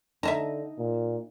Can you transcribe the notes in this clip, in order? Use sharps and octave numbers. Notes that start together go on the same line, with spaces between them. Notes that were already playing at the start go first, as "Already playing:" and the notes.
D3 D#4 E5 A5 A#5
A#2